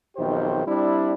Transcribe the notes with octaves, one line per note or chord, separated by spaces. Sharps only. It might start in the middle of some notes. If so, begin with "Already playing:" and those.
B1 F2 D#3 G4 C5
G3 C4 D4 E4